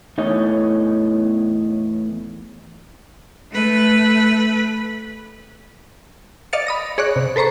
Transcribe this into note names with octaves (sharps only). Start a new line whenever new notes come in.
E2 A2 E3 D#4 C#5 D#5
A3 B4
D5 D#5 F5 A6 C#7
B5 D#6 A#6
G#4 C#5 D5 C#6 F#6
C3
A4 B4 C5 A#5 C#6